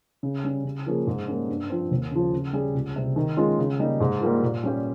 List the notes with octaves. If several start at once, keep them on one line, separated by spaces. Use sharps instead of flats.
C#3
G3 C#4
C#3
F3 A#3 C#4 G#4
G#2
G3 A#3 C#4
G2
F3 C4
D#2
C#3 F3
C#3
G3 C#4 G#4
C#2
C3 G3
D#3
G#3 C#4 F4
C#3
G3 A#3 D#4
G#2
G3 A#3 F4
A#2
G3 C#4 G4